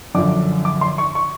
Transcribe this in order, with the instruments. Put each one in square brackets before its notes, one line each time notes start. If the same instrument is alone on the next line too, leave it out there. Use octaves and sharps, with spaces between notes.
[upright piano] F#2 D3 F3 D6
D6
C6
C#6
C#6